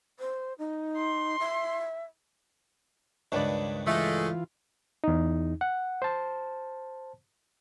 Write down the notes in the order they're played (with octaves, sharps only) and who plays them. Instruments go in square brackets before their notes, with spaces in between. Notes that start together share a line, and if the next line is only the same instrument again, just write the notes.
[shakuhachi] C5
D#4
[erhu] C6
[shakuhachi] E5
[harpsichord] C#2 G2 D#3 [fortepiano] D4 B4 D5
[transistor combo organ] E3 F4 [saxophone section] G#3 A3
[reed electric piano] E2 D#4
F#5
C5 A5